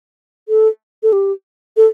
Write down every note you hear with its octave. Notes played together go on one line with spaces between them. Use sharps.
A4
A4
G4
A4